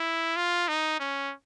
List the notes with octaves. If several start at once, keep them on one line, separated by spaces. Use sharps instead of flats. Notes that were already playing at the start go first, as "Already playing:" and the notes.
Already playing: E4
F4
D#4
C#4